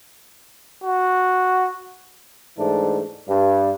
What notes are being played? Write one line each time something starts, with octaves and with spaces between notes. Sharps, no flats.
F#4
G#2 E3 A3 D4
G2